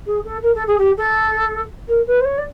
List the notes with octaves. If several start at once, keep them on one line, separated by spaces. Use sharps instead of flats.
G#4
A4
A#4
A4
G#4
G4
A4
A#4
B4
C5
C#5
D5